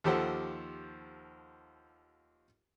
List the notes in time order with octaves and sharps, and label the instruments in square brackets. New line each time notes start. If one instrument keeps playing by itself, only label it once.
[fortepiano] D#2 F3 G4 A4 C5 F#5